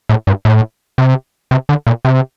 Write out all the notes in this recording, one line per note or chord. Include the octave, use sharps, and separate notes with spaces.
A2
G2
A2
C3
C3
D3
A#2
C3